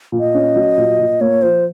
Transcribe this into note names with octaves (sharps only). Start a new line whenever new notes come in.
A#2
D#5
C#4
F#3
A#2
A#2
A#3 C#5
F3 C5